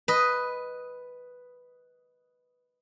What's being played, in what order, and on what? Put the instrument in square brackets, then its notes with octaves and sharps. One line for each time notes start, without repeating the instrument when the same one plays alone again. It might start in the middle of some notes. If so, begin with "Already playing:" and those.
[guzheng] B4 D#5